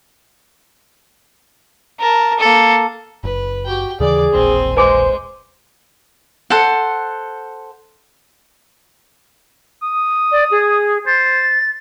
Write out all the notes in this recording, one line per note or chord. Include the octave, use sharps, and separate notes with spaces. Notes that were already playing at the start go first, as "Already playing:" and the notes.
A#4 A5
A#3 A4
F#1 B4
F#4 G4 G5
D#2 C#3 E3 G#4 D5 D6
E1 A#1 C4 G#5
G#3 B4 C5 G#5 D6
A4 C5 F#5
D#6
D5
G#4
C5 A6